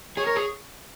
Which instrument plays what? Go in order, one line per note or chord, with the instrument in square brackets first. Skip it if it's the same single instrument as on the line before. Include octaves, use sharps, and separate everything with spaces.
[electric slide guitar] G#4 [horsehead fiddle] C#5
[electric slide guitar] A#4
G#4